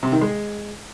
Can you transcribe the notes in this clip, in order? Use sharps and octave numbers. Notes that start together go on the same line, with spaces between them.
C3
D#3
G#3